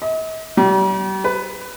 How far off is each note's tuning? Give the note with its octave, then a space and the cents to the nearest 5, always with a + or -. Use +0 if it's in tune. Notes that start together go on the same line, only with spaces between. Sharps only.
D#5 +45
G3 -40
B4 +15